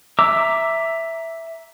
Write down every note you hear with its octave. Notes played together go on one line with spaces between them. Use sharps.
E5 A#5 D6 E6